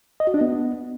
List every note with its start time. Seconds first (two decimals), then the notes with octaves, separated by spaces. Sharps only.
0.20 D#5
0.27 F#4
0.34 D4
0.41 B3